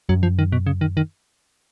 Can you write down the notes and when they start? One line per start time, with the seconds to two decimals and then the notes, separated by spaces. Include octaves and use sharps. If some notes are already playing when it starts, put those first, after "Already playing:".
0.09 F#2 F#3
0.23 F3
0.39 D#3
0.52 B2
0.67 C#3
0.81 D#3
0.97 D#3